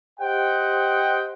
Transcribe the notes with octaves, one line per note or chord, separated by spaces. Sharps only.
G4 C5 D#5 F#5 G5